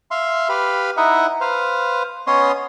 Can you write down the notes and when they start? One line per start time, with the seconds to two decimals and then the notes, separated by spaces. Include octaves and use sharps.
0.11 E5 F5 C6
0.49 G4 B4 F5 B5
0.97 D#4 E4 D#5 E5 F#5
1.41 B4 C5 F5
2.27 B3 C#4 C#5 D#5 C6 D#6